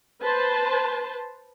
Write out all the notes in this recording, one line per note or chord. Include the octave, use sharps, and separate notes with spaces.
B4 C5 A5